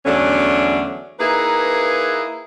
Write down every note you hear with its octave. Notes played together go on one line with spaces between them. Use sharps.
E2 D3 F#3 A3 C#4 D4
A#3 D#4 E4 G#4 B4